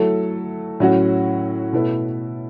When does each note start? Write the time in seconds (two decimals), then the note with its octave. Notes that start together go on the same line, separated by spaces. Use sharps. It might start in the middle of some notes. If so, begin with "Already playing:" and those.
Already playing: F#3 A3 E4 A4
0.80 A2 F#3 C#4 F#4
1.73 B2 A3 E4 B4